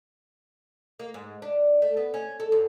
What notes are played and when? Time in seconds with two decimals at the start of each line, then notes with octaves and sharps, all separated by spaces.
0.99 A#3
1.14 G#2
1.42 D4
1.82 A3
1.97 B3
2.14 C#4
2.40 A4
2.52 F#2